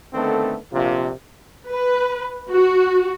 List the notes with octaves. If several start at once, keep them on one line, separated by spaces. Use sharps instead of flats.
D3 D#3 A3 B3 C4 A4
A#1 C3 F4
B4
F#4